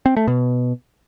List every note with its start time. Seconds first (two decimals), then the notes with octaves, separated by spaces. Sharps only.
0.06 C4
0.17 A3
0.28 B2